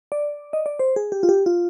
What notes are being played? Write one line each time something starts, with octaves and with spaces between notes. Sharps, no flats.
D5
D#5
D5
C5
G#4
G4
F4
G4
F4